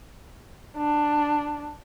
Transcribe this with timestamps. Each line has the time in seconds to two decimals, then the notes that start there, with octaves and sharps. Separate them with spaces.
0.77 D4